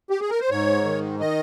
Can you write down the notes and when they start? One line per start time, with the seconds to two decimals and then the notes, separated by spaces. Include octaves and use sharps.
0.10 G4
0.20 G#4
0.30 A#4
0.40 C5
0.50 G#2 C#5
0.84 D#3
1.20 D#3 D#5